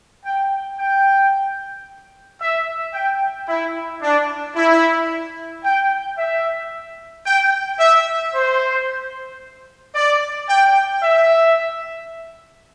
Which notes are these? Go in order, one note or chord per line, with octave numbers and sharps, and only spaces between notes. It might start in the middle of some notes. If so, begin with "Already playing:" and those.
G5
G5
E5
G5
E4
D4
E4
G5
E5
G5
E5
C5
D5
G5
E5